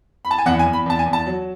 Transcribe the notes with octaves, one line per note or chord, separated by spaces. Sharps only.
B5
A5
G#5
E2 F#5
G#5
E2
B5
E2 A5
G#5
E2
A5
F#3